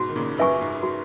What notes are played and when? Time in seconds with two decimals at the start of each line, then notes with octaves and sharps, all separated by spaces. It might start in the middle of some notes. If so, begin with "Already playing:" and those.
Already playing: G#2 B2 F#4
0.09 D#3
0.16 A#2 C#3
0.38 F#2 B4 E5 G#5 C#6
0.61 G#2
0.83 F#4